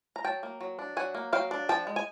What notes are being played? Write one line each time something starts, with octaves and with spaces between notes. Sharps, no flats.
A#5
F#3 G5 A5
A#3
F#3
D4
F#3 F#5 G#5
A#3
F#3 F5 G5
D4
F3 G5 A5
G#3
G#5